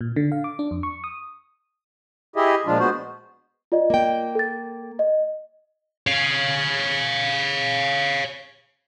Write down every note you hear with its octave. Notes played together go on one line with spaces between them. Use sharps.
A#2
D3
F5
D6
D4
F2
C#6
D#6
E4 G4 G#4 D#5 E5
A#2 F3 G#3 D4 F4
G#3 B3 F#4 C5
F4 D5 D#5
A#3 G5
A4 A6
D#5
C#5 F5